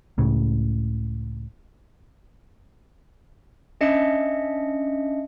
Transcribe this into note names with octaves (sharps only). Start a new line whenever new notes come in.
C#2 A2 C#3
C#4 D4 D#5 E5 C#7